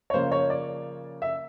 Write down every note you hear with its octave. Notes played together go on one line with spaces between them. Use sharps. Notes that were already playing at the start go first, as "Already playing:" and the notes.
C#5
C#3 F3 A#3 C5
C#5
D5
E5